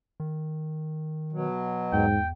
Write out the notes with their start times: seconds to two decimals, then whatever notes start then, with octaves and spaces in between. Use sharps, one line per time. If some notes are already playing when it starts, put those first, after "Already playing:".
0.20 D#3
1.32 B2 F#3
1.92 E2 G#2 G5